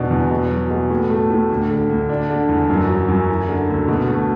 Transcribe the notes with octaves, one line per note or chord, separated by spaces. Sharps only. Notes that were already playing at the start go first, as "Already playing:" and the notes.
Already playing: E2 B2 D4
E2
B2
F#3
B2
A2
A3
A2
D2
D3
D2
D4
D3
E2
F#2
F#3
F#2
E4
D3
D2
B2
A3